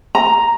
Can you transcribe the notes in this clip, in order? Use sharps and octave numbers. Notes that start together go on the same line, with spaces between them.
A#5